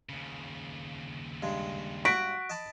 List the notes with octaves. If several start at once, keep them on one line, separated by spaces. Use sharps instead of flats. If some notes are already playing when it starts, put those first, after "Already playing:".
D#2 C#3
G2 G#3
F#4 B6 D7
D#5 A5 B5